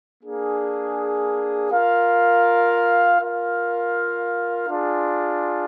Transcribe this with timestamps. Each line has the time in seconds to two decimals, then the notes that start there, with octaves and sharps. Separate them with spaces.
0.22 A#3 D4 G#4
1.71 F4 A#4 F5
3.19 F4 A#4 F5
4.67 D4 F4 G#4